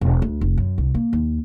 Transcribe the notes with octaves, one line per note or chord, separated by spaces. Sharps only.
E1
D2
F1
F#2
C2
A#3
D#2